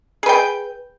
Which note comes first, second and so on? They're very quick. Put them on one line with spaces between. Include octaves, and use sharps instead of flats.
G#4 B4 G5